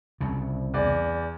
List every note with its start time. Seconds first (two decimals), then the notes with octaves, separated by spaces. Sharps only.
0.20 C2 C#3
0.74 E2 D5